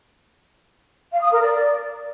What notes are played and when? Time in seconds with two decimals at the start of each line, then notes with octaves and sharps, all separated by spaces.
1.12 F5
1.22 D#6
1.32 A#4
1.42 D5